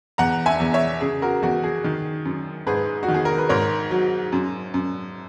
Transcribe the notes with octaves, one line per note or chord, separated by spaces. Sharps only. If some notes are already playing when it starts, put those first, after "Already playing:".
E2 F#5 A#5
E5 G#5
E2
C#5 E5
C#3 G#4
F#4 A#4
E2 F#4
G#4
D#3
F#2
G#2 G#4 B4
F#4
D#3
G#4
A#4
B4
G#2 A#4 C#5
F#3
F#2
F#2